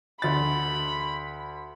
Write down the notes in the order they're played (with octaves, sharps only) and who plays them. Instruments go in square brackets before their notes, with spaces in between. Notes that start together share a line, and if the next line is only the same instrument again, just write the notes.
[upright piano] D2 A6 [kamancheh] B5